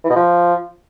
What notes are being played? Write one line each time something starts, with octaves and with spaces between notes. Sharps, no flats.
E3
B2
F3